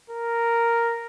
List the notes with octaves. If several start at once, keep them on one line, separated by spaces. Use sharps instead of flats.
A#4